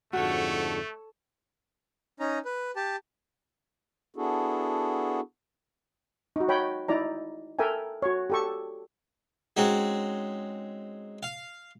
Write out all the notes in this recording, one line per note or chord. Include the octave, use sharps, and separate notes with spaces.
F2 G#2 D3 A3 F#4 A4 C#5
C#4 D#4 A#5
B4
G4 A5
B3 D4 E4 F#4 G#4 A4
D#4 F#4
C#5 G5 B5
D#4 E4 D5 A#5
A4 A#4 E5 G5 G#5
F#4 C#5
G4 A4 C#6
G#3 C4 C#4 D#4 F#4
F5